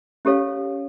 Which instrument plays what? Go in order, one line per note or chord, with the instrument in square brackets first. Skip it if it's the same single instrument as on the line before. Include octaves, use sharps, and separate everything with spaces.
[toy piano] C#4 G4 A4 C#5 F5